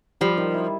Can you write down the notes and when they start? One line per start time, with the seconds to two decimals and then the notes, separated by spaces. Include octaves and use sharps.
0.21 F3 G3
0.37 D#3
0.54 E4